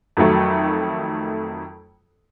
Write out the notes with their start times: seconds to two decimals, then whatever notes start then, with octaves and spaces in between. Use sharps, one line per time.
0.17 F2 D#3 F#3 A3